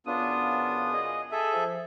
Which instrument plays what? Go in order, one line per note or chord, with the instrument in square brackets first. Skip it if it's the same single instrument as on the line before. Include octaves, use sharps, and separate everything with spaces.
[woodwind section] F#2 C#3 D#6 [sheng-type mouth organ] B3 D4 F4
[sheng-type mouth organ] G#4 D#5
G#4 A4 E5
[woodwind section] F3